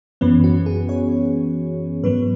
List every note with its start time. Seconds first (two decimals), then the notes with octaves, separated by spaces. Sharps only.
0.21 F#2 E3 B3 C#4
0.44 F#4
0.66 G#4
0.89 C#5
2.03 G#2 F#3 B3 B4